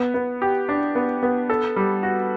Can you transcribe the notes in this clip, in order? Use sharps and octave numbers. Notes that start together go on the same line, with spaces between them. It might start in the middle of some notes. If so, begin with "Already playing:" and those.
Already playing: B3
B3
G4
D4
B3
B3
A4
G3
F#4